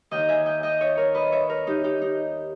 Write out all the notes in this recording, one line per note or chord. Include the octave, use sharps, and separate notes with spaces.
D#2 D#3 D#5 G5
E5 G#5
D#5 G5
D#5 G5
C#5 E5
A#4 C#5
B4 D#5
C#5 E5
A#4 C#5
D#4 G4
D#4 G4
D#4